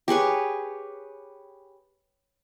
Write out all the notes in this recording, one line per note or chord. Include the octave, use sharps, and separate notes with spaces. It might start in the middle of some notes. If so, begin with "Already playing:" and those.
G4 G#4 B4 C#5